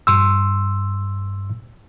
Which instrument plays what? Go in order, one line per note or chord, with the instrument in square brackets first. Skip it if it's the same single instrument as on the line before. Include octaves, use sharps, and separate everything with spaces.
[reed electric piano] G2 C6 E6